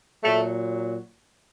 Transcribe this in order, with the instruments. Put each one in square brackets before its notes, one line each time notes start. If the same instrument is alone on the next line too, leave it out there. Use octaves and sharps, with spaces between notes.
[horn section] A#2 F#3 A3